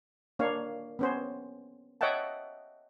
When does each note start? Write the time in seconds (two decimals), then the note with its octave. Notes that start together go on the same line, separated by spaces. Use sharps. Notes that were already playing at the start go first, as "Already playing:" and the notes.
0.39 A#3 D4 C#5 F5
0.99 B3 C#4 C5
2.01 C#5 D#5 E5 F#5 G5 A5